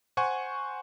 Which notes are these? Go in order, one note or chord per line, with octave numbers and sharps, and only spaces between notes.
C5 F#5 G#5 C#6